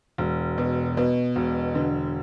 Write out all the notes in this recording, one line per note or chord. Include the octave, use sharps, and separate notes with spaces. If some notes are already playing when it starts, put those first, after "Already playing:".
E1
B2
B2
E1
D3